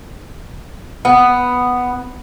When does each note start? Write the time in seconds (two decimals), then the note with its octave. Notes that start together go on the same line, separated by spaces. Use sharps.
1.05 B3